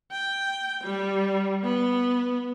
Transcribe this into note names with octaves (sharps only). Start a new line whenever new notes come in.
G5
G3
B3